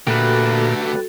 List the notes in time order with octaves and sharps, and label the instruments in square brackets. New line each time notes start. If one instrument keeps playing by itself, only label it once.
[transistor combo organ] A#2 [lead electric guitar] D3 A3 [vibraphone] F#4 A4 [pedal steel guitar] G4 B4